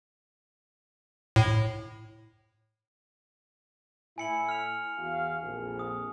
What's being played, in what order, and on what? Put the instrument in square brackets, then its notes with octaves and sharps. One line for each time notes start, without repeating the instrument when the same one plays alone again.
[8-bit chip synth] A2
[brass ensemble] A2 E4 [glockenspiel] G#5 C#7 F#7
[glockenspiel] F6 F7
[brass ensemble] E2 F#4 F5
A#1 F2
[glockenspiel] D#6